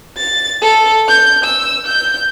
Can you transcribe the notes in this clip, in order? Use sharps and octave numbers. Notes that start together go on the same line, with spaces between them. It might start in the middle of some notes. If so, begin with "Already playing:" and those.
A6
A4
G6
E6
G6